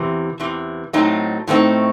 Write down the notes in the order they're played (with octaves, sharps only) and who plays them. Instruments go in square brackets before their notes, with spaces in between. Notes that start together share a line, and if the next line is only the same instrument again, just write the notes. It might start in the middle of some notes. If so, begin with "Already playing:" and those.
Already playing: [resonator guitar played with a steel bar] E2 C3 E3
E2 C3 E3
A2 F#3 A3 C4 D#4
A2 F#3 A3 C4 D#4